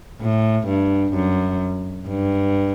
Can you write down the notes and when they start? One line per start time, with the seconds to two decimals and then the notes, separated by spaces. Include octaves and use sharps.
0.21 A2
0.68 G2
1.15 F#2
2.09 G2